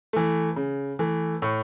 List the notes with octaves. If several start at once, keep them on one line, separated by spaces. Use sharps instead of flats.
E3 A3
C#3
E3 A3
A2 C#6